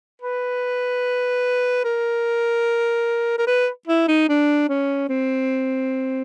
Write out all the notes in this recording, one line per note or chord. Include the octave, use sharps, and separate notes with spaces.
B4
A#4
A#4
B4
E4
D#4
D4
C#4
C4